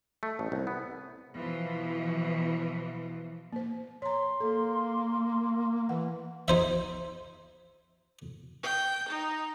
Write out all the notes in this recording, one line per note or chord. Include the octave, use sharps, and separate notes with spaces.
A3
A1
C2
B3
B2 E3 F3
A#3 C5
C#5 A#5 C6
A#3 A4
E3 F#5
D#4 C5 E5
G5
D#4